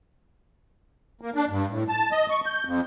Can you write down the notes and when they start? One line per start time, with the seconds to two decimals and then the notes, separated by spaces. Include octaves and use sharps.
1.21 A#3
1.35 D4
1.50 G2
1.70 A2
1.89 A5
2.11 D#5
2.30 C#6
2.46 G6
2.65 F2